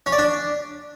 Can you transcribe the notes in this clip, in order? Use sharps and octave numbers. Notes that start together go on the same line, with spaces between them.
C#4
D5
D4